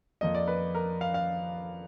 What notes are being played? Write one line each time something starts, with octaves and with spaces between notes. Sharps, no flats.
F2 F3 A#3 D#5
D5
B4
A#4
F5
F5